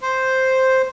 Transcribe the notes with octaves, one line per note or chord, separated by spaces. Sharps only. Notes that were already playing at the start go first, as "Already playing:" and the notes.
C5